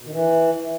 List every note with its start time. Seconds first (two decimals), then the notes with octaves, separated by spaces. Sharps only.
0.01 B2
0.06 D#3
0.12 E3